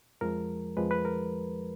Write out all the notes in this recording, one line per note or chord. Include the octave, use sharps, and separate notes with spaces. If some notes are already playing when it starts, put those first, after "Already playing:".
F2 F3 G#3 A#4
F2 F3 G#3 B4
B4
A#4